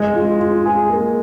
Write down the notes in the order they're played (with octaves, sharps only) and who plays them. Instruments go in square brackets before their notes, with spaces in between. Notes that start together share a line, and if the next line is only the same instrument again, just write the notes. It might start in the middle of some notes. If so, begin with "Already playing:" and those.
Already playing: [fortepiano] G#3
[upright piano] F4
F4
G#4
A#3